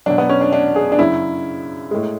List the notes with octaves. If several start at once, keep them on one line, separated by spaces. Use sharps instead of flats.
B2 F#3 D4
B3
C#4
D4
D4
G#4
D4
F#2 C#3 F#3 E4
A2 G#3